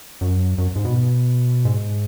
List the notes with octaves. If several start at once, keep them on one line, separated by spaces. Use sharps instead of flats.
F#2
F#2
G#2
B2
G#2